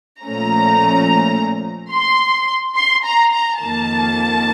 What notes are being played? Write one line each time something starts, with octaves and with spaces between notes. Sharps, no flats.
A#2 F3 A3 C#4 A#5
C6
C6
A#5
A#5
F2 D#3 A#3 A5